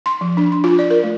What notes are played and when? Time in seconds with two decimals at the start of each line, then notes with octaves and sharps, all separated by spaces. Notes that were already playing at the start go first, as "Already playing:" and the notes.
0.06 C6
0.21 F3
0.37 D4
0.52 C6
0.64 F4
0.79 D5
0.90 A#4
1.03 A3